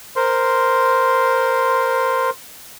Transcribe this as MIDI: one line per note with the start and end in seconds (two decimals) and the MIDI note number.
0.16 2.30 70
0.16 2.30 72
0.16 2.30 84